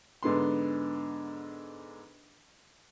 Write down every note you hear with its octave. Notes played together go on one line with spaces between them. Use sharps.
G#2 D3 B3 C6